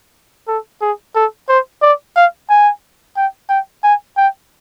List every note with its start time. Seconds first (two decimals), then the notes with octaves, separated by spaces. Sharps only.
0.48 A4
0.81 G#4
1.15 A4
1.49 C5
1.82 D5
2.16 F5
2.50 G#5
3.16 G5
3.49 G5
3.84 G#5
4.17 G5